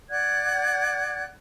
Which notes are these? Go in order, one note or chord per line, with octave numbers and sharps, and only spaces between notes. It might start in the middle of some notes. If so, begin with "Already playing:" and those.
D5 F#5 F#6 G#6